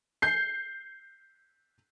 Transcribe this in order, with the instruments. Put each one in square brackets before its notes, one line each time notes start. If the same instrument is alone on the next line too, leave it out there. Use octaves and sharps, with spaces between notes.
[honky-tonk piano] G6 C7